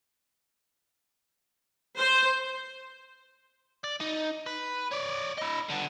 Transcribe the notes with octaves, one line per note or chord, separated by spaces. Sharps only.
C5
D5
D#4
B4
C#5 D5
E4 D#5
D3 B3